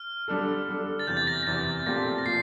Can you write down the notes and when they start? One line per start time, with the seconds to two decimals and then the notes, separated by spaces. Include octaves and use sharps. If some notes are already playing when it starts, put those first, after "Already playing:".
Already playing: F6
0.28 D3 G3 D4 A4
0.68 D3 G3 D4 A4
0.99 A6
1.07 E2 C3 E3 G6
1.17 A6
1.27 A#6
1.43 A#6
1.47 E2 C3 E3 A6
1.86 A#2 F3 A3 C4 G4 A#6
2.18 A#6
2.25 A#2 F3 C7